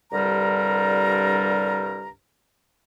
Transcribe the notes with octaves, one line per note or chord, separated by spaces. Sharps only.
C2 G2 D3 G3 A#4 A#5